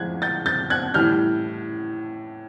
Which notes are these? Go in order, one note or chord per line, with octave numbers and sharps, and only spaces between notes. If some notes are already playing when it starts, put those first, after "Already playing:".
Already playing: A2 F3 G#3 F#6 G#6
G6 A6
G6 A6
F#6 G#6
A2 E3 G3 F6 G6